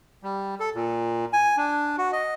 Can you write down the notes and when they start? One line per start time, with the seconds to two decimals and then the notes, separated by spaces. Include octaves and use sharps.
0.23 G3
0.60 A4
0.75 A#2
1.33 G#5
1.57 D4
1.98 F#4
2.12 D#5